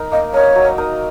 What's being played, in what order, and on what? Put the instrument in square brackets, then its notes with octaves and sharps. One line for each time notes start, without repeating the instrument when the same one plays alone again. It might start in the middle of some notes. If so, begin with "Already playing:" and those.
Already playing: [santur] D#4 A#4
[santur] A#3 [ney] D#5
[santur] D#4 A#4 [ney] C#5
[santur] F#3
D#4 A#4 D#5